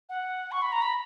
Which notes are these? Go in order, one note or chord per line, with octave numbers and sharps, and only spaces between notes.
F#5
C#6
B5
A#5
B5